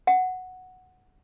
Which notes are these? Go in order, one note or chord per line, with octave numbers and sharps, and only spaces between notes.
F#5